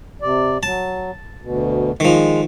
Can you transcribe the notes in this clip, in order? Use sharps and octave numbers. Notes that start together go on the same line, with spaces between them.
C3 D5
F#3 A5
D2 B2
D#3 F3 G#3